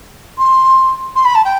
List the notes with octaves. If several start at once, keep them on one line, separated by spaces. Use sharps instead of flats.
C6
C6
B5
A5
G5